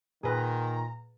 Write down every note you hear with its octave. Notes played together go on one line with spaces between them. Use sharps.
A#2 D#3 G#4 B4 A#5